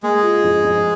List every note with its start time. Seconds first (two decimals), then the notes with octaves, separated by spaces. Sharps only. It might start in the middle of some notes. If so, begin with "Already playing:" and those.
0.03 G#3 A#3 G#4
0.23 F4
0.44 F2
0.64 F2